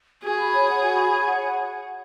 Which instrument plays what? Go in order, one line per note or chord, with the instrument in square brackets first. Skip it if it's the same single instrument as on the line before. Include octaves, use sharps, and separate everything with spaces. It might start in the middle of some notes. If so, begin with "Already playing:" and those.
[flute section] F#4 [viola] G#4
[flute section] B5
C#5
F#5
F#4
B5
C#5
F#5